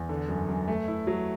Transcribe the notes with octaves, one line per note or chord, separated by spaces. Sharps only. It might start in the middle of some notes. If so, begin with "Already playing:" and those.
Already playing: E2
D3
F#2
F#2
A3
E4
F#3